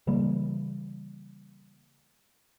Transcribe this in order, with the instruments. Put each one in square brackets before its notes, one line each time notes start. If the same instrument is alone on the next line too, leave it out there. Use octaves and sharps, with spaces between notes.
[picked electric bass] C#3 E3 G3 A#3